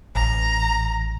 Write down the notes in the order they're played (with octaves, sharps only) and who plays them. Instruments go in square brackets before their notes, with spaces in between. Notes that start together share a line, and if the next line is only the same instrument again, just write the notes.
[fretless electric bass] A1 [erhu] A#5